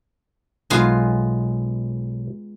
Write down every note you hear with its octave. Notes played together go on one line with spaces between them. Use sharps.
B1 G#3 B3 F4 G#5 A#5